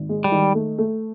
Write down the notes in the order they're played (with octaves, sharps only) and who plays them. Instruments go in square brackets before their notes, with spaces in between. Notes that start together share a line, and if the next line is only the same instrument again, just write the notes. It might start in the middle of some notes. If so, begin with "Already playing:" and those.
Already playing: [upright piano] G#1
G#3
[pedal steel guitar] G3
[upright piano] D#3
A3
A3